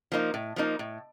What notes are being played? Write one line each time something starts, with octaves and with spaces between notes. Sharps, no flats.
F3 A#3 D#4
A2
F3 A#3 D#4
A2